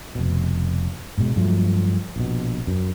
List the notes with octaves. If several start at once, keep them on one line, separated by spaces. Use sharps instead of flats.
F1 B2
G#2 B2 G#3
G2 F3 F#3 A3
A#1 B2
F#2